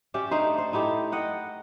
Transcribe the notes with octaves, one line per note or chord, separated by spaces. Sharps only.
C#4 G4 D5 E5
A3 D4 D#4 C5
C5
D#4 E4 G4 A4
D#5 F#5 G5